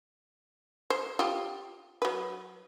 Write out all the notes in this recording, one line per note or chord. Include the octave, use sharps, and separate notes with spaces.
C5
F4 G4
F#3 B4